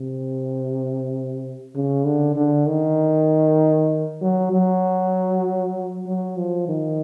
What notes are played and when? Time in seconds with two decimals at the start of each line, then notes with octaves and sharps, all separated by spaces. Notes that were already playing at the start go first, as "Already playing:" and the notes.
Already playing: C3
1.75 C#3
2.05 D3
2.36 D3
2.67 D#3
4.22 F#3
4.52 F#3
6.07 F#3
6.37 F3
6.69 D#3